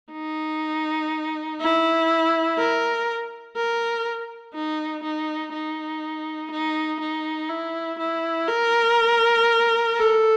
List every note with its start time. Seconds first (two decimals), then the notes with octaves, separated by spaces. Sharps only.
0.12 D#4
1.60 E4
2.58 A#4
3.56 A#4
4.54 D#4
5.03 D#4
5.53 D#4
6.51 D#4
7.01 D#4
7.49 E4
7.99 E4
8.48 A#4
9.95 A4